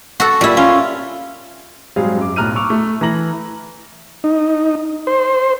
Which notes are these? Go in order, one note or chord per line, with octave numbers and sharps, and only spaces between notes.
F#4 A4
A#2 G3 E4
C#4 F4
G#2 F#3 G3 C4 G#4 F5
F#2 D6
B1 A2 A#5 F6 F#6 D#7
C#6 D6 E6 F7
A3
E3 A3 A#5 A#6 F#7
D#4
C5